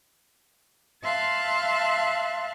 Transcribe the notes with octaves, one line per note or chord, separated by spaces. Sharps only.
E5 F5 A5 C6 F#6